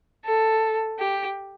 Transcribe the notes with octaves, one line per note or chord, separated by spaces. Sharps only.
A4
G4